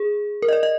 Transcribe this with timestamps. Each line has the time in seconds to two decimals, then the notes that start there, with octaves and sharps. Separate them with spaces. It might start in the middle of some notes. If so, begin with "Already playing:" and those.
Already playing: G#4
0.42 A#4
0.48 D#5
0.53 D5
0.63 D#5